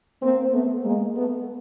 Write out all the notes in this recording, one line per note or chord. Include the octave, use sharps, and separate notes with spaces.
A#3 C4
A3 B3
G#3 A#3
A3 B3